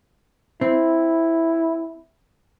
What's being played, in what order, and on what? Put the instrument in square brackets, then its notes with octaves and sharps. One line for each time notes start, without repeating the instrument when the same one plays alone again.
[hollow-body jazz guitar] C4 [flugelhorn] E4